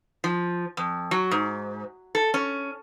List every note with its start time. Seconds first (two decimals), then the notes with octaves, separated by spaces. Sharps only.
0.24 F3
0.77 F2
1.11 F#3
1.31 G#2
2.15 A4
2.34 C#4